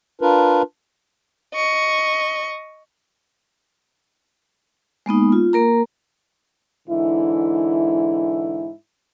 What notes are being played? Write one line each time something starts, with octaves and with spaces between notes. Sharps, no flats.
D4 F4 A#4 B4
D#5 C#6
G#3 A#3 B3 D#4
F4
A#3 A#4 A#5
G#2 D3 E3 E4